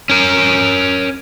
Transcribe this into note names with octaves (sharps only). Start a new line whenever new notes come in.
C#4 A#4